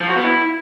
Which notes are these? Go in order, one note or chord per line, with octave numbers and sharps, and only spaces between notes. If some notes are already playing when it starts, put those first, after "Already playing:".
F3
F#4
B3
E4